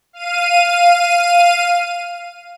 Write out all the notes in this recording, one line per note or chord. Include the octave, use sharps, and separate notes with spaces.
F5 D#7